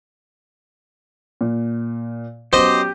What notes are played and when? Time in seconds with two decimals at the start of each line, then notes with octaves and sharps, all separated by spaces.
1.41 A#2
2.53 F#3 B3 C#4 G4 C5 D#5